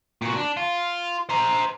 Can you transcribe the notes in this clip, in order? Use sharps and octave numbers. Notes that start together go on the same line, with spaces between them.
A#2 F#4
D4
F4
C5 A#5